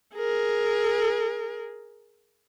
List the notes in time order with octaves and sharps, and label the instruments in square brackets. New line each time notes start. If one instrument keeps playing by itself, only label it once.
[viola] G#4 A#4